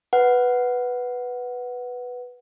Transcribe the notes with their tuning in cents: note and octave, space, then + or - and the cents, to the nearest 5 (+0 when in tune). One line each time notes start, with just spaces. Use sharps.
B4 +0 F#5 +0